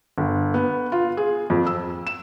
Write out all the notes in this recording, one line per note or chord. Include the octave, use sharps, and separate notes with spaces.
G1
B3
F4
G#4
F2
E6
E7